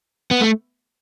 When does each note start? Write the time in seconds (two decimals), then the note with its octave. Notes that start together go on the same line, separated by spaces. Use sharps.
0.31 B3
0.41 A3